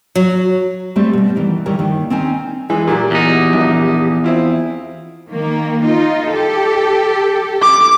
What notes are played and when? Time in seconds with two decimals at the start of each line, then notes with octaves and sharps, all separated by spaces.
0.16 F#3
0.96 G3 A3 C4 C5
1.13 B2 G3
1.36 D#3 E3
1.66 D#3 E3 G3 G4 A#4 C#5
1.79 D#2 D#3
2.10 C4 C#4 D#4 G#5
2.70 E3 G#3 G#4
2.87 A#2 F#3 G4
3.11 E2 D#4 G4
3.53 A#1
4.24 C4 E4 F4
5.30 D#3 A#3
5.83 D#4 F4
6.31 G4 A4
7.62 D6